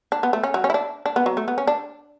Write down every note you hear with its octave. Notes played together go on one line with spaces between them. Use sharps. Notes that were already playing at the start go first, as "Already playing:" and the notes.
D4
B3
A3
C#4
F#3
C#4
E4
D4
D4
B3
F#3
A3
B3
C#4
D4